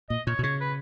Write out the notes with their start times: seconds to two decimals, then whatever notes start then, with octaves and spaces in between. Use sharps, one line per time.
0.10 A#2 D#5
0.27 A#2 C#5
0.39 B2
0.43 C#3 C#5
0.61 B4